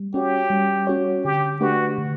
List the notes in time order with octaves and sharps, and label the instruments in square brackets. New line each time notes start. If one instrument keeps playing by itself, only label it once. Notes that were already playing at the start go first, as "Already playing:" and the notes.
Already playing: [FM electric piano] G3
[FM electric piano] C#4 F#4 C#5 [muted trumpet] G4
[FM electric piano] G3
C#4 F#4 C#5
[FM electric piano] D3 [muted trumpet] G4
[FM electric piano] A3 D4 G4 B4 [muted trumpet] F#4
[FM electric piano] D3